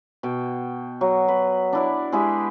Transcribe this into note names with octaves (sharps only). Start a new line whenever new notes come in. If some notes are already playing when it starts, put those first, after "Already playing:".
B2 G5
F#3
B4
D4 E4 D5
G#3 E4 G4 G#4